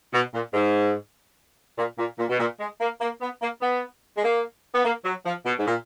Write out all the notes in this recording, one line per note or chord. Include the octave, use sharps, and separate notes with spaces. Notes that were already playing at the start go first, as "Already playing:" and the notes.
B2
A#2
G#2
A#2
A#2
A#2
B2
A#2
G#3
A#3
A#3
B3
A#3
B3
G#3
A#3
B3
A#3
F#3
F3
B2
G#2
A#2